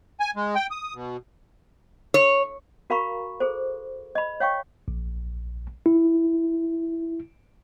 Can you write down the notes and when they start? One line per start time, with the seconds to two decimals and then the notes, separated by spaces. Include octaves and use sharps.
0.20 G#5
0.36 G#3
0.55 G5
0.71 D#6
0.94 B2
2.14 C#5
2.90 F#4 A#4 F5 A#5 B5 C#6
3.40 G#4 A4 C5
4.15 D#5 B5
4.40 C#5 F5 G5 C#6
4.88 A#1
5.86 E4